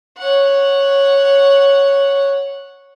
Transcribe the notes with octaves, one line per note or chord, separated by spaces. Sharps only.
C#5 F#5